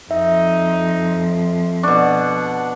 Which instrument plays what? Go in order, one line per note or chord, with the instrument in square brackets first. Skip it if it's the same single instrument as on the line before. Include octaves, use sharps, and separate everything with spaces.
[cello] F2 [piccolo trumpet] D#4 [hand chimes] E5
[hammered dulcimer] B2 D4 [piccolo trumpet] F#5 [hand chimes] C#6